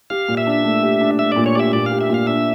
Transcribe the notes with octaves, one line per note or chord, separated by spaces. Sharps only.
G4 F5
A#2
E5
D4
A3
G4
D4
A3 E5
A#2 D5
C#5
G4 D5 E5
A#2 D5
F5
G4
E5
A#2 F5
D4 E5